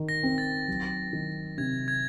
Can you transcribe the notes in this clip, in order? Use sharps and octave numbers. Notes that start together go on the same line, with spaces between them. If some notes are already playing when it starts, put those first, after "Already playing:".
Already playing: D#3
A#6
C4
A6
F#3
D#3
C3 G#6
G#6